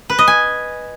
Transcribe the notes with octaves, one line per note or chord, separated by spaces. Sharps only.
B4
D#5
G#5